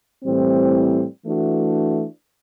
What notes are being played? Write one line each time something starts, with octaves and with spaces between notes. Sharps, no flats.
A2 E3 G3 C4
E3 A3 D4 F#4